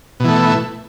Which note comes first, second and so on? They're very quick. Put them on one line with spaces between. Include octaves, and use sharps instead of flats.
B2 E3 A3